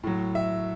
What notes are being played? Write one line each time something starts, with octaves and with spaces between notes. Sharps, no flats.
A2 F#3
E5